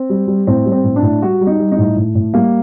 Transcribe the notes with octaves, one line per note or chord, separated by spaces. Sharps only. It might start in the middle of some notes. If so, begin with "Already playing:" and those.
Already playing: C4
G3
G3
A2 C4
G3
C4
A2
D4
A2
G3 F#4
G3
D#4
G3
D#4
A2
A2
A2
G3 A#3